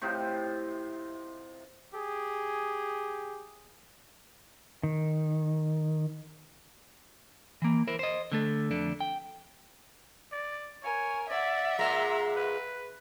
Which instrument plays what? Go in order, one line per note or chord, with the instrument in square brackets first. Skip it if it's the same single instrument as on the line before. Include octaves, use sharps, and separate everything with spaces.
[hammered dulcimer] A2 C3 D#4 F4
[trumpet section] G4 G#4
[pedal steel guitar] D#3
[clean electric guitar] E3 A#3
E4 A#4 C5
C5 D#5
D3 A3 A4
F2 D3 A3 D4
G5
[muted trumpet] D5
[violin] A#4 G#5 [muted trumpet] C#5
[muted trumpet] D5 [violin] E5 F#5
[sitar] A#2 G#3 [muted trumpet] A#5
[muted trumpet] B4